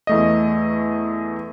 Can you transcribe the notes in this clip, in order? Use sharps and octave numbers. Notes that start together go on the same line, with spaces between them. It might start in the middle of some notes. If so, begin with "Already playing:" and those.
E2 A3 D#5